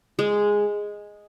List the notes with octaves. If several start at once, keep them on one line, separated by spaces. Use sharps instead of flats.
G#3